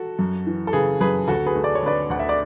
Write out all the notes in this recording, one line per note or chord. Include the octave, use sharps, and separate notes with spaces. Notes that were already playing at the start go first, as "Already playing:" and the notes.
Already playing: F#4 A4
F#2
E3
A4
C#3 G#4 B4
F#2 G#4 B4
D2 F#4 A4
G#4 B4
A3
D5
C#5
D3 B4 D5
D2 F#5
E5
D5